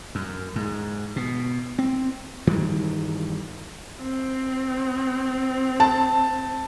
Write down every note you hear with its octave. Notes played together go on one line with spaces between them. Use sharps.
F#2
G#2
B2
C4
G2 D#3 E3 G3
C4
A5